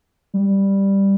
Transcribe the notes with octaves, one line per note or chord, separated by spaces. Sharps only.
G3